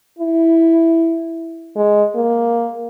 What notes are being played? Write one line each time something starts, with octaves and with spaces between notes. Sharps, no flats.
E4
G#3
A#3